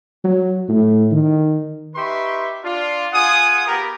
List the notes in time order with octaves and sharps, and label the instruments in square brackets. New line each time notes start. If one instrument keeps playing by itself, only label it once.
[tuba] F#3
A2
D#3
[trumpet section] D#4 G4 B4 E5 C6 C#6
D4 F4
F4 G#4 F#5 G#5 D#6
B3 G4 A#4 B4 A#5